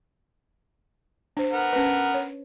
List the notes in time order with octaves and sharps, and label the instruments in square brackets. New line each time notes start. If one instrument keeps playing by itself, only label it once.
[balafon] D4 C5
[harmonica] B3 A#4
[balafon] C#4 B4
C#5